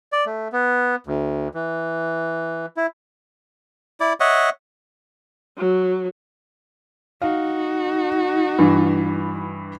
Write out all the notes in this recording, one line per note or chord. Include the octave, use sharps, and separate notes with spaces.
D5
A3
B3
D2
E3
E4
E4 D5
C#5 D#5 E5 F#5
F#3
D#4 F#4 F5
G2 E3